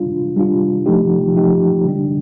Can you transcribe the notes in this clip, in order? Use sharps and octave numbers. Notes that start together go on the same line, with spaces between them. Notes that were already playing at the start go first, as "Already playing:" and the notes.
Already playing: G3 D4 F4
G3 D4 F4
F3 A3 D#4 G4
F3 A3 D#4 G4
D3 G3 D4